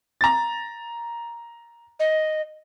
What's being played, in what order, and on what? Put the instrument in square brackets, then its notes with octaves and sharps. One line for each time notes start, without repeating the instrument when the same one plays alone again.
[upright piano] A#5 A6
[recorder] D#5